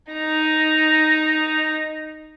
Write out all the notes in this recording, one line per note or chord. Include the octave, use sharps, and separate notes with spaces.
D#4 A#5